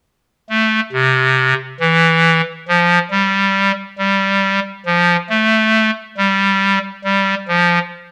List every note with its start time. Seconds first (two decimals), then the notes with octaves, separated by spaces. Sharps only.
0.50 A3
0.93 C3
1.80 E3
2.68 F3
3.11 G3
3.99 G3
4.86 F3
5.30 A3
6.18 G3
7.04 G3
7.48 F3